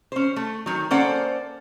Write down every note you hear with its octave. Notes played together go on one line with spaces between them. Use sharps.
C#4 C5
A3
D#3 F#3
A#3 C#4 A4 C5 D5 F#5